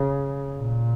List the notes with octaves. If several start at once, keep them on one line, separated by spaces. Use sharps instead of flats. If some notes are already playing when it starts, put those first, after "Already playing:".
Already playing: C#3
A#2